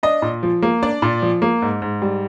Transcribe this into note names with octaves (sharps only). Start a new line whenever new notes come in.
D4 D#5
A#2
F3
A#3
D4 D5
A#2
F3
A#3
G#2
G#2
G3